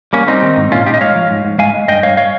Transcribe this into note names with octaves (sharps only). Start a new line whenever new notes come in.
G3 A#3 C#4
G3 C4 D#4
D#3
G#2
A#2 C#4 F4
A#2 D#4 G4
D#5
G#3 C#5 F5
F3
G#2
G#2
G#3 F5 G#5
G#3
G2 D#5 G5
G2 C#5 F5
C#5 F5